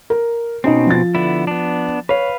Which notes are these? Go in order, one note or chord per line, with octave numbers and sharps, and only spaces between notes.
A#4
B2 C4 C#4 D#4 D#5
F3 A6
D3 B3 E4
B3 D4
B4 C#5 F5